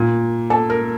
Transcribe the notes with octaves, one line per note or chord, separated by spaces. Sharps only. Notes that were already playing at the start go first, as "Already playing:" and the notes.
Already playing: A#2
A4
A#4